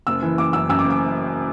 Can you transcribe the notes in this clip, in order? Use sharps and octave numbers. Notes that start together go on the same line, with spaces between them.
F#1 E6
E3
F#1 D6
F#2 E6
F#2 E6
D6
F#1
D6